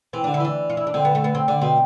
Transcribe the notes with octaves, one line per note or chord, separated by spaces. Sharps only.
E3 C4
D3 D4
E4
E3
D4
F4
E4
D4
D3 C4
B3
A3
B3
C4
D3 D4
B2 C4